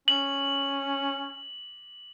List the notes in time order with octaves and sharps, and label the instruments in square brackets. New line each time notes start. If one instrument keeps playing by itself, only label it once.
[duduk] C#4 [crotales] F#7